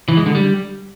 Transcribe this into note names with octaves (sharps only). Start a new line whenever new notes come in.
E3
G#3
D3
G3